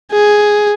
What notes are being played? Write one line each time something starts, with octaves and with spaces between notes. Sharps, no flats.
G#4